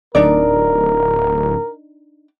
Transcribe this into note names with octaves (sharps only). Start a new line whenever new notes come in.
D1 D4 D#4 A#4 D5